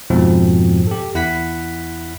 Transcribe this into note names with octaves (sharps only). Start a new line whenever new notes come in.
F2 G#2 B2 F3 C4
G4 A4
E2 E4 F#5 B5 B6